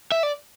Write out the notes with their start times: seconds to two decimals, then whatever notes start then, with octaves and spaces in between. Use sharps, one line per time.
0.12 E5
0.23 D5